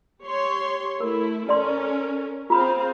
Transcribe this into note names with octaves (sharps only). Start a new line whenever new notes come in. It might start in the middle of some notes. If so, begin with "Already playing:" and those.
G4 C#5 C6
A3 E4 A#4
C#4 A4 A#4 D5 C6
C4 F4 G#4 F5 B5